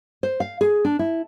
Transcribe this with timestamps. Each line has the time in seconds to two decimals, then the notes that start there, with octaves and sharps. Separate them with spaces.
0.23 C5
0.40 F5
0.61 G#4
0.85 D4
0.99 E4